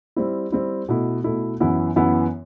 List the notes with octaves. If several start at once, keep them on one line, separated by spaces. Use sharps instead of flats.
G3 C4 E4
G3 C4 E4
B2 A3 E4
B2 A3 E4
F#2 E3 B3 E4
F#2 E3 B3 E4